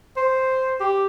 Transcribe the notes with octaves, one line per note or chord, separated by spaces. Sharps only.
C5
G4